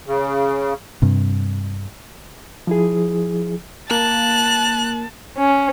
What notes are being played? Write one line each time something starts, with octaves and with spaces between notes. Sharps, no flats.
C#3
G2 C3
F3 E4 G#4
A#3 A5 F#6
C#4